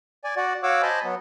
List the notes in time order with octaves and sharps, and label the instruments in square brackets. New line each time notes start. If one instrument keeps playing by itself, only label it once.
[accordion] D5 G#5
F#4 D5 F#5
F#4 C#5 F5 F#5 D6 E6
C5 D#5 G#5 A5 B5
F#3 B3